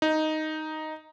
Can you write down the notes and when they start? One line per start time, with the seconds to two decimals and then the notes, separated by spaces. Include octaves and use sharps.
0.02 D#4